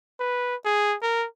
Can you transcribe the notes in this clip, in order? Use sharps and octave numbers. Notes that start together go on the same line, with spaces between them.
B4
G#4
A#4